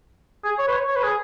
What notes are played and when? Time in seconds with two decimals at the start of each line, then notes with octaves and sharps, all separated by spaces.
0.44 G#4
0.59 C#5
0.68 B4
0.73 C#5
0.88 C#5
0.96 B4
1.04 G#4